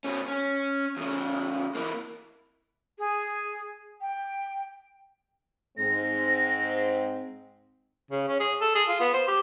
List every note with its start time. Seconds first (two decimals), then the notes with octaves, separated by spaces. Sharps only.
0.04 B2 C#4
0.28 C#4
0.97 E2 C#3
1.75 E3 A#3
2.98 G#4
4.01 G5
5.78 G#2 G#3 C4 A#6
8.11 C#3
8.28 C#4
8.40 G#4
8.61 A4
8.75 G#4
8.88 F4
9.00 B3
9.14 C5
9.28 G4